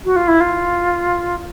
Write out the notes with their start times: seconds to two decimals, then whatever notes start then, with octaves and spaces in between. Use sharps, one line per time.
0.05 F#4
0.16 F4
0.28 E4
0.40 F4